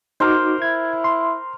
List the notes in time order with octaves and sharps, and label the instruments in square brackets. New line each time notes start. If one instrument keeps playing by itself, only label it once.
[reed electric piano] D#4 F#4 D6 [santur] A#4 C5
[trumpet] E4 [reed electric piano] G#6
[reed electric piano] C6